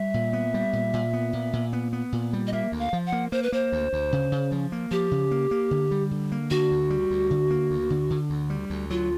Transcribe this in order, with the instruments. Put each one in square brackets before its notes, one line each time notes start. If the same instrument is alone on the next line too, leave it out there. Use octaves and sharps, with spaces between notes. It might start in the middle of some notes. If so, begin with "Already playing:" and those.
Already playing: [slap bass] G3 [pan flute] E5
[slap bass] A#2
B3
G3
A#2
A#2
B3
A#2
A#2
B3
B3
A#2
G3
[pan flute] D#5
[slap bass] A#3 [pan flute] E5
[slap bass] D2
[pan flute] F5
[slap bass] F3
[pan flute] F#5
[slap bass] A#3
[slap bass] A#3 [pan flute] C5
[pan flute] B4
[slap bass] A#3 [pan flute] C5
[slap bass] D2
D2
C#3
C#3
F3
A#3
[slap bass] F3 [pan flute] G4
[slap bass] C#3
A#3
A#3
D3
G3
D3
A#3
[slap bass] D3 [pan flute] F#4
[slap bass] D2
G3
D2
D3
A#3
D2
D3
D3
D2
G3
D2
[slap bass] F#3 [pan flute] F4